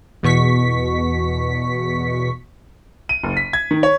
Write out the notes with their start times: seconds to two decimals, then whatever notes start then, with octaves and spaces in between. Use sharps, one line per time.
0.23 E2 B2 C#6 B6
3.09 D#7
3.23 F#1
3.37 B6
3.53 G#6
3.71 D#3
3.83 C#5